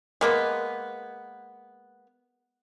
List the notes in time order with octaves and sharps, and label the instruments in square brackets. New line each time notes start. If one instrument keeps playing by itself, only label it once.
[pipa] G#3 A#3 B3